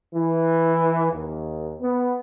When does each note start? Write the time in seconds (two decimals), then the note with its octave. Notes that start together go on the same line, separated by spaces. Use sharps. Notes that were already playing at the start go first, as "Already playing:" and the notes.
0.14 E3
1.12 D#2
1.81 B3